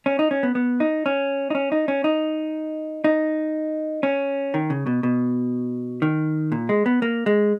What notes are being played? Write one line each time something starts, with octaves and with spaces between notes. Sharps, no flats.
C#4
D#4
C#4
B3
B3
D#4
C#4
D#4
C#4
D#4
C#4
D#4
D#4
C#4
D#3
C#3
B2
B2
D#3
A#2
G#3
B3
A#3
G#3